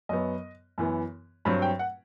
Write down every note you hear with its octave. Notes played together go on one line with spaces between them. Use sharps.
F#2 F#3 B3 D#5
F#2 E3 B3
G2 F#3 C4 B5
G5
F#5